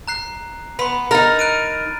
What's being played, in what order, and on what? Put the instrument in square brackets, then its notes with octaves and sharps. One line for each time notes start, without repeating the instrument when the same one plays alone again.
[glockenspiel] A#5 F#6 C7
[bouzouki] B3 [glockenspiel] B5 C6
[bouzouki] D#4 A#4 [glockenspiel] A#5 F6 A6
[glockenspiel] F#6 D7 D#7